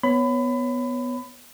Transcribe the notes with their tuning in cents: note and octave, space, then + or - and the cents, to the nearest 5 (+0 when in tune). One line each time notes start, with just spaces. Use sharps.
B3 +0 C#5 +0 B5 +25